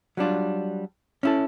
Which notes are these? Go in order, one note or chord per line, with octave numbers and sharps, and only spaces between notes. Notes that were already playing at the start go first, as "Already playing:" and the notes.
F#3 G3 D4 F4
C#4 E4 A4